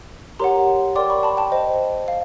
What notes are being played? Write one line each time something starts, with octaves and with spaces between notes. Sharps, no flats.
G4 A#4 C#5 F#5 A#5 C6
A#4 D5 G5 C6 D6
B5 C#6
A5 B5
G5 A5
C5 D#5 G5
F5